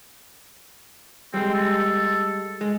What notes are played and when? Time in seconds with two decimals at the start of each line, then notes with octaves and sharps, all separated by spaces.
1.34 G3 G#3 C4
1.54 A4
2.61 G#3